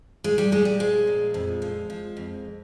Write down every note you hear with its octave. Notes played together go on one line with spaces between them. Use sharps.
A#2 G#3
G3
A#2 G#3
G3
F3 G#3
A#2
F2
F3
F3
F2